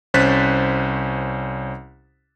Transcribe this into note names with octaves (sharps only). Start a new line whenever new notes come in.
C2 C#4 C5 F#6 A6 B6